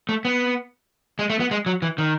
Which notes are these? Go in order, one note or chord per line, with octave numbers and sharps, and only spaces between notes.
A3
B3
G#3
A3
B3
G#3
F#3
E3
D#3